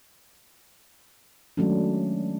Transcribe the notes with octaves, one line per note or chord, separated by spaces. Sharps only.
D#3 F#3 G#3 A3 C#4 D4